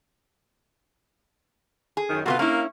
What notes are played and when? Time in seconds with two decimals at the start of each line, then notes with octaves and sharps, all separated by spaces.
1.97 G#4
2.10 F#2 D#3
2.26 C3 A#3 B3 F4 F#4
2.39 A#3 C#4 E4 A#4 F5